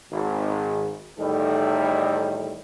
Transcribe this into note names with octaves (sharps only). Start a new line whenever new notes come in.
G#1
E2 A2 D#3 G3 D#4 A4